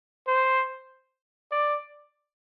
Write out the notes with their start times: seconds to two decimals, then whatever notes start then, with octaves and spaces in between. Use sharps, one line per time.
0.27 C5
1.51 D5